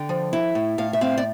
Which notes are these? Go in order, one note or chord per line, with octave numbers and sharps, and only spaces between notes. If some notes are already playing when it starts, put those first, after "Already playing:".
Already playing: D3 G5
F3
E4
A2
A2 F5
E5
C4 F5
D5